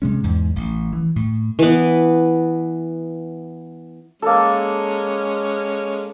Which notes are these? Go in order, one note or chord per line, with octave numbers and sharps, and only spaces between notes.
C3 G#3 C#4
E2 G#2
A1
E3
A2
E3 B3
G#3 A#3 C#4 A4